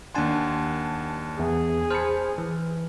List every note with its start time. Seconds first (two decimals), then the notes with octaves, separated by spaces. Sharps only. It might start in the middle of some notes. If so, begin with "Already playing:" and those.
0.15 D#2 D4 F#5 G#5 A5 C6
1.39 E2 G#4
1.90 C5 A5 B5 F6 C#7
2.38 E3